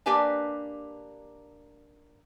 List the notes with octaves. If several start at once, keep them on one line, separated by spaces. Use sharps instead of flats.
A#3 D4 G4 B4 G#5 A5